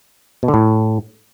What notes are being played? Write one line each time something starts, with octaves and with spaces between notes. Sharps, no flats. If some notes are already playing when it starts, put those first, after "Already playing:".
B2
D3
A2